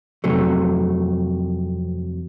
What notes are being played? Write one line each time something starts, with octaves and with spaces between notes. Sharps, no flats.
F2 C3 F#3 A3